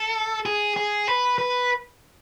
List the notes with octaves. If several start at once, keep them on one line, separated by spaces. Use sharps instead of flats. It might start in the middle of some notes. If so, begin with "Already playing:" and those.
Already playing: A4
G#4
G#4
B4
B4